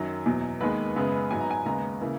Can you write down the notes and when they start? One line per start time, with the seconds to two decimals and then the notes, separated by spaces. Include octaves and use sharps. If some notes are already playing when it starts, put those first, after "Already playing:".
Already playing: F#2 D#3 F#3
0.26 E2 B2 F#3
0.61 D#2 D#3 G#3 B3 B4
0.96 F#2 C#3 G#3 B3
1.31 G#2 F#3 B3 G#5
1.40 A#5
1.51 G#5
1.65 D#2 C#3 G#3 B3 A#5
2.01 C#3 E3 A#3